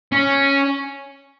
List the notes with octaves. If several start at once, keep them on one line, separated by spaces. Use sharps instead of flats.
C#4